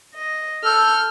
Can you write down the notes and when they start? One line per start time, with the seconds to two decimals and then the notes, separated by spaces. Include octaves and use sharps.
0.14 D#5
0.65 A4 F6 G6